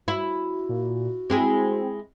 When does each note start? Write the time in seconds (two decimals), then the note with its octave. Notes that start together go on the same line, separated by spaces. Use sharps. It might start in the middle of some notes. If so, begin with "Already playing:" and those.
0.08 E4 F#4
0.69 A#2
1.30 G#3 C4 E4 G#4